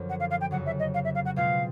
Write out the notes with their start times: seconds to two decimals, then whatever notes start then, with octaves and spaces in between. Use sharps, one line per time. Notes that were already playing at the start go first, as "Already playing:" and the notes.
Already playing: F#2 D3 F3
0.09 F#5
0.20 F5
0.30 F5
0.41 G5
0.51 F2 C#3 F#3 F#5
0.66 E5
0.79 D#5
0.94 F5
1.05 E5
1.15 F5
1.25 F#5
1.36 B2 G#3 C4 F4 F5